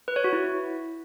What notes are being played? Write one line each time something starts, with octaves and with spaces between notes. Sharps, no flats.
B4
C#5
F#4
E4